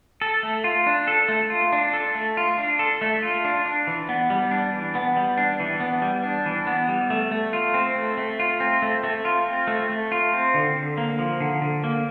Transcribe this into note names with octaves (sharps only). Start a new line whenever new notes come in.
A4
A3
F4
D4
A4
A3
F4
D4
A4
A3
F4
D4
A4
A3
F4
D4
D4
E3
B3
G3
D4
E3
B3
G3
D4
E3
B3
G3
D4
E3
B3
G3
A3
A3
F4
C4
A3
A3
F4
C4
A3
A3
F4
C4
A3
A3
F4
C4
D3
D3
A#3
F3
D3
D3
A#3